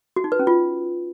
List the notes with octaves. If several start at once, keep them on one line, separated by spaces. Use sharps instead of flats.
F#4
D#4
B4
C#4
F4